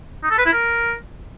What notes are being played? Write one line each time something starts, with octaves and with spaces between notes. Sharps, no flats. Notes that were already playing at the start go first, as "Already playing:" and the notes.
D#4
A4
B4
E4
A#4